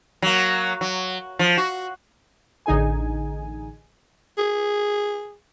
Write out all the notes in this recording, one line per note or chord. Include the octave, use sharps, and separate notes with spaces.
F#3 A#3
F#3
F3
F#4
A1 D3 D#4 G#4 G#5
G#4